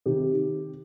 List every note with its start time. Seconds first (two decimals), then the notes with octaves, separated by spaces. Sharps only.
0.06 C3 D#3 G4